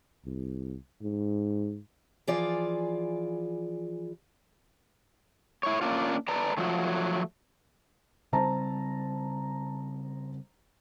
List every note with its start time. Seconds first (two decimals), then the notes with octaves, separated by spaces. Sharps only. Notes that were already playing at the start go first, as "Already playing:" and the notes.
0.25 C2
1.02 G#2
2.27 E3 F3 F4 G#4 D5
5.63 E4 C#5
5.81 A#3 C#4 D4 F4
6.28 B4 D5 A5 A#5
6.57 F3 F#3 A3
8.33 C#3 G3 C4 C5 A5 A#5